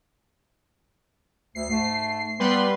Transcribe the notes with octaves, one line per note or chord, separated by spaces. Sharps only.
D2 C7
G#2 A3
G3 B3 B4 C6